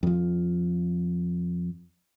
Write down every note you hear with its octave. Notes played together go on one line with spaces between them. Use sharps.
F2 F3